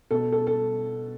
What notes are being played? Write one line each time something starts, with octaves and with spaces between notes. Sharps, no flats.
B2 A4
A4
A4